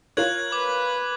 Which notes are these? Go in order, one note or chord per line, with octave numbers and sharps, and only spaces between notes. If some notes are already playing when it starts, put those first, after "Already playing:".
F4 A#4 C#5 F#6 G#6 F#7
B4 D6